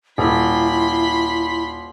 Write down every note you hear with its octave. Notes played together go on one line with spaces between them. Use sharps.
D#1 E4 B5 C6